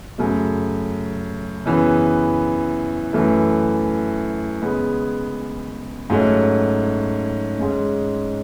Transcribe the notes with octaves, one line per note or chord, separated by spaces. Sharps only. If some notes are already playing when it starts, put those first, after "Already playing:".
F#2 C#3 F#3 A3
F#2 C#3 E3 B3
F#2 E3 A3
C#3 G#3 B3
G#2 F#3 A3 C#4
G#2 G#3 C#4